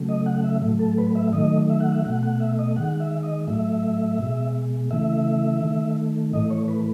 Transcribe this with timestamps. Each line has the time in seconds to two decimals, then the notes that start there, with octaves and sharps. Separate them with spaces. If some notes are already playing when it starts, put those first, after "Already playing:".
Already playing: C#3 F#3 A3
0.09 D#5
0.26 F#5
0.44 E5
0.61 A2 F#3 A3
0.79 A4
0.98 B4
1.15 E5
1.33 D#3 F#3 A3 D#5
1.70 E5
1.80 F#5
1.92 E5
2.04 B2 A3 F#5
2.23 F#5
2.40 E5
2.59 D#5
2.76 D#3 G#3 F#5
3.00 E5
3.23 D#5
3.48 A2 F#3 A3 E5
4.18 B2 G#3
4.91 C#3 E3 A3 E5
5.61 D#3 A3
6.33 A2 E3 A3 D#5
6.51 C#5
6.68 B4